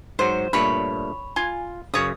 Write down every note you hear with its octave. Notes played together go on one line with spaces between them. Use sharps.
G#2 F#3 C5
G2 A#2 A3 C#5 B5
F4 G#5
F#2 C#3 C#5 D#6